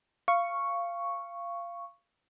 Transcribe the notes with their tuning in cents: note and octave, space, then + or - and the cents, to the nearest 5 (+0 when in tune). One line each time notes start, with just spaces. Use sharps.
F5 -15 C#6 +0